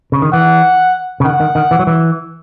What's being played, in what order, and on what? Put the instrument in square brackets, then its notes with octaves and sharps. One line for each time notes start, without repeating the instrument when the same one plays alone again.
[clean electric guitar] C#3
D#3
[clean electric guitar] E3 [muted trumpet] F#5
[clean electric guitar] C#3
[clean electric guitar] D#3 [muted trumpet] F#5
[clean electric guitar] D#3
D#3
E3
F#3
E3